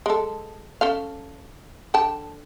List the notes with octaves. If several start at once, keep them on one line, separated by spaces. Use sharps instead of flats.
G#3 A4
C#4 A4 F5
D3 G5 A5